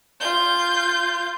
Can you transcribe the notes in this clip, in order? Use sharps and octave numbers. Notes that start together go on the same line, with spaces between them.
F4 G6